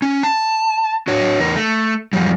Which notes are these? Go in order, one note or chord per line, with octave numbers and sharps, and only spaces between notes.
C#4
A5
D4 F#4 C#5
E2 A#4
A3
F#2 F3 G3